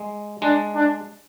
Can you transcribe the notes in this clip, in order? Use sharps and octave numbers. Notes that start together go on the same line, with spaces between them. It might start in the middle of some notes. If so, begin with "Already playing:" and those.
Already playing: G#3
G#3 D4
D4